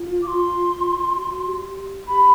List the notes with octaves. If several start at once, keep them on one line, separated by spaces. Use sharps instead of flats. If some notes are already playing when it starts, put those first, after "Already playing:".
Already playing: F4
D6
C6
F#4
G4
G4 B5